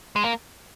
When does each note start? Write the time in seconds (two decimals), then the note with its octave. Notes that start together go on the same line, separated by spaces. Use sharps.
0.16 G#3
0.24 A#3